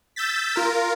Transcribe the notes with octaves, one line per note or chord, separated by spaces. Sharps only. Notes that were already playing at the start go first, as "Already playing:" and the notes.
E6 G6 A6 B6
F4 A#4